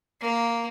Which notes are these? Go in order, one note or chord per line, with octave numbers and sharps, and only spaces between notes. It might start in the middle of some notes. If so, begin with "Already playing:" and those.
A#3